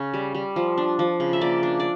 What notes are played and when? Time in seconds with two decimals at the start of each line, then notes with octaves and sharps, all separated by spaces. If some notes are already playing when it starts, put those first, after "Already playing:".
Already playing: C#3 C#4
0.14 G3
0.35 G3
0.56 F3
0.78 D4
0.99 F3
1.20 C#3
1.33 E5
1.41 A#3 D5
1.63 D4
1.80 D5